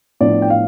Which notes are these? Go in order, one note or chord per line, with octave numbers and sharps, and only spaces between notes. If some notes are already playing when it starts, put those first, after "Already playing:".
A2 F3 B3 D4 D5
G5
F5